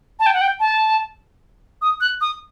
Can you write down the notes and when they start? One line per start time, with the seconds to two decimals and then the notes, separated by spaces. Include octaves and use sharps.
0.20 A5
0.26 G5
0.33 F#5
0.41 G5
0.60 A5
1.82 D#6
2.01 F#6
2.21 D#6